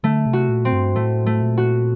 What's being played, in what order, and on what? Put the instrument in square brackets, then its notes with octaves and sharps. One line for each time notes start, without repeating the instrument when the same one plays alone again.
[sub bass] D3 [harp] A3
[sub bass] C3
[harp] F#4
[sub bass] A#2
[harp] C4
[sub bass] G2
[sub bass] A2 [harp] A3
[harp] A3
[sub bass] A#2
[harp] F#4